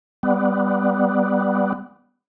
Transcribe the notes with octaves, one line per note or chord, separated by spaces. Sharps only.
G3 B3